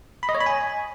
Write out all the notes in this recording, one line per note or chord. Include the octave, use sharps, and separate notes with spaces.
B5
D#5
C#5
B5
G#5